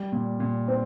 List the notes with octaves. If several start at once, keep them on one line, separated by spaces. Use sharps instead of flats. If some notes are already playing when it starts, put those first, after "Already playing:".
Already playing: G3
A#2
A#2
C4